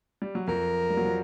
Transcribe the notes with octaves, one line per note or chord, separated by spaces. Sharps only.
G3
F#3
F2 F3 A#4
G3
F#3
F3